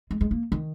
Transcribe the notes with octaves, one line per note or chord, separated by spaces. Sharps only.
G#3
G#3
A#3
D#3